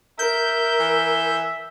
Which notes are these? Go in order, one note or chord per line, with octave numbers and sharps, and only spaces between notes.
A#4 E5 G6
E3